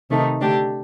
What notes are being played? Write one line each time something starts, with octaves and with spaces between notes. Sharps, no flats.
C3 D#3 A3 D#4
D3 A3 D4 G4